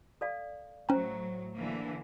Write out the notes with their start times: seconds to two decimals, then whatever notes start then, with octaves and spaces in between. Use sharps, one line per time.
0.21 A4 D5 F5
0.89 A2 F#3 C#4 C5 G5 A#5
1.55 D3 E3 A#3